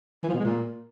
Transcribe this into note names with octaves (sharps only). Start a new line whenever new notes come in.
E3
F3
B2
G#3
A#2